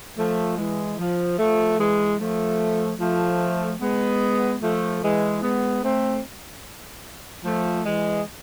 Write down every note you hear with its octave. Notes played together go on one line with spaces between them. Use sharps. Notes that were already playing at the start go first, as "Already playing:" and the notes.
F3 A3
E3 G#3
F3
F3 A3
E3 G#3
F3 A3
F3 A3
G#3 B3
F3 A3
E3 G#3
G#3 B3
A3 C4
F3 A3
E3 G#3